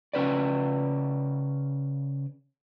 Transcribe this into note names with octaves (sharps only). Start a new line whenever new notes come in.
C#3 C#4 B4 D5